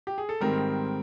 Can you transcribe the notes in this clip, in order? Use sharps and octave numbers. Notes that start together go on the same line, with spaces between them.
G4
G#4
A4
G#2 D#3 G3 C4 A#4